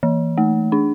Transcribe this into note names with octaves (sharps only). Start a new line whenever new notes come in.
E3
A3
D4